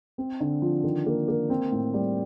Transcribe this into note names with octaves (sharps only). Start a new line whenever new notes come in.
C4
D3
F3
D#3
A#3
A#3
C4
A2
G3